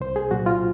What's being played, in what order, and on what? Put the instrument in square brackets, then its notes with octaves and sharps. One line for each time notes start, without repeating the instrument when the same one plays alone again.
[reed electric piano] C2 C5
G#4
A#2 F#3 F#4
F4